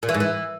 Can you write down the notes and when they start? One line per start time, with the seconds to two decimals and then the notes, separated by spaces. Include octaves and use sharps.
0.03 A#2
0.09 E3
0.14 G#2
0.20 E3